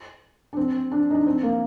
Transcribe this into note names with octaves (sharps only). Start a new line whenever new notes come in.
D4
C4
D4
D#4
D4
C4
A#3